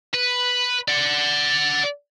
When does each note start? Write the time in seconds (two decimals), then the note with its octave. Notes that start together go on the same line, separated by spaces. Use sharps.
0.14 B4
0.88 D5 F#5